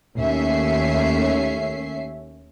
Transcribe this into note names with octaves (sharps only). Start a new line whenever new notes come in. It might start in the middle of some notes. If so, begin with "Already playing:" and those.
D#2 A3 C#4 E5 C7